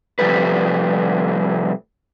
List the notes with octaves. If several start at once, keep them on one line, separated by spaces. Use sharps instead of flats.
C3 F3 G3 A3 B4